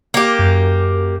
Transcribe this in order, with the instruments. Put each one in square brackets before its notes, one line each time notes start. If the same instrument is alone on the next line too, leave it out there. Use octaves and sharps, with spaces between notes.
[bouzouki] A#3 G4
[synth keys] F#2